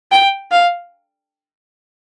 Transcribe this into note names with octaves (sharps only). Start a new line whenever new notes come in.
G5
F5